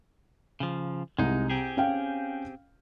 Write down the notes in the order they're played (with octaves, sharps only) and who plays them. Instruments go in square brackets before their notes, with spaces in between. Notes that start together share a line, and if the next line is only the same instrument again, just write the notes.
[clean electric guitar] C#3 F3
[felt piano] C2 [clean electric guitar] G#3 D#4
[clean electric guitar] C4 G4 G#4
[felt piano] C#4 F5 G5